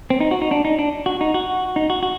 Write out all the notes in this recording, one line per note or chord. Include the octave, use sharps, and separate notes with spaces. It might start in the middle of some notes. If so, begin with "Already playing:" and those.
C4
D#4
F#4
D#4
D4
D#4
D4
F#4
D#4
F#4
D#4
F#4
F#4